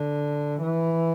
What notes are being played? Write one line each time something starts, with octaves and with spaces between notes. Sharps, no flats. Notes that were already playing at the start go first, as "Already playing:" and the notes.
Already playing: D3
E3